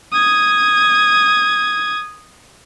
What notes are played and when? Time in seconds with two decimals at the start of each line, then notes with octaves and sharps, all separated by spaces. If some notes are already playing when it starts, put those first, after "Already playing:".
0.13 D#6 G#6